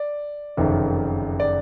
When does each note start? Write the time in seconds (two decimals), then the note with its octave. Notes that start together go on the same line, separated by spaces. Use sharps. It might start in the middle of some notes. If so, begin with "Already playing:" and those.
Already playing: D5
0.57 F#1 F2 C3 D#3
1.40 D5